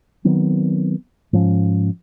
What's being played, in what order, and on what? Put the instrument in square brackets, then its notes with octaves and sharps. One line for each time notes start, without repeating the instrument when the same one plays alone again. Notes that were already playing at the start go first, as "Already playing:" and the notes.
[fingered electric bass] D#3 F#3 B3 C4
G#2 F3 C#4